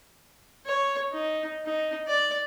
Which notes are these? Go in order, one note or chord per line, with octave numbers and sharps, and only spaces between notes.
C#5
D#4
D#4
D5